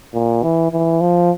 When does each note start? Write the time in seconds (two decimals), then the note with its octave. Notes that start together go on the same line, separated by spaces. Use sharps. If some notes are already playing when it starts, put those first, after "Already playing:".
0.14 A#2
0.43 E3
0.72 E3
1.01 F3